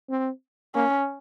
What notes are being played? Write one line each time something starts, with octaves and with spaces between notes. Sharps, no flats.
C4
A#3 C#4